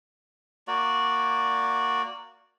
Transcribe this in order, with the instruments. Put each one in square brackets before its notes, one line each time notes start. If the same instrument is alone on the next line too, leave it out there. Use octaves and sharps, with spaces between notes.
[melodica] A#3 F#4 D5